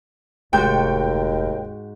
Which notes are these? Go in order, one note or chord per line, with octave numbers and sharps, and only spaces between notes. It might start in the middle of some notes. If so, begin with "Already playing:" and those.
F1 D#2 G#2 F#4 G5 G6